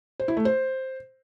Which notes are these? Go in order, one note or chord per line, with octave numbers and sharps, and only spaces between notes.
C5
E4
A3
C5